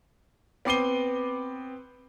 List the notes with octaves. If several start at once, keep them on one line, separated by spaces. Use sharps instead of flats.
B3 C4 D6 C7 D#7 G7